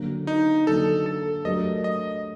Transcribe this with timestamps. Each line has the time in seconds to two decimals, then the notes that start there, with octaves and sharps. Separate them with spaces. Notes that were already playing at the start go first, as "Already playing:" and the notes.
Already playing: D3 F#3 A#3
0.27 D#4
0.67 D3 F#3 A#3 A4
1.06 A4
1.45 F#3 A3 D4 G4 A#4 D#5
1.84 D#5